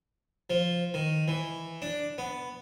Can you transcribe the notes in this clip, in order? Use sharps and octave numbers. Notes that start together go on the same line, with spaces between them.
F3
D#3
E3
D4
B3